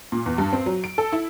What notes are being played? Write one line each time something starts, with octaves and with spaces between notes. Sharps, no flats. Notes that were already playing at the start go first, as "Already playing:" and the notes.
A#2
E2
G2
C4
F#3
D7
A4
E4